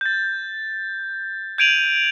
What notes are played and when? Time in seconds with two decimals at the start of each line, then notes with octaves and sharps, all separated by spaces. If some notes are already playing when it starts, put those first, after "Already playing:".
0.01 G6 A6
1.58 G6 G#6 D7 D#7 F7 F#7